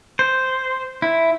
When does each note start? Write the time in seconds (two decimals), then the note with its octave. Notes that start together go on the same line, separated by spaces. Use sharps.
0.19 C5
1.02 E4